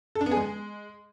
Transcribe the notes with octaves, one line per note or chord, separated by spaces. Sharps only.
A4
D4
B3
G#4
G#3